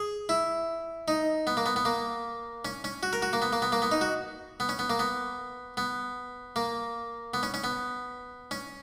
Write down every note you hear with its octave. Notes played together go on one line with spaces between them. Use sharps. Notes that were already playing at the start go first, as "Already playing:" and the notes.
Already playing: G#4
E4
D#4
B3
A#3
B3
B3
A#3
C#4
C#4
F#4
A#4
F#4
A#3
B3
A#3
B3
A#3
B3
D#4
F#4
B3
C#4
B3
A#3
B3
B3
A#3
B3
C#4
C#4
B3
C#4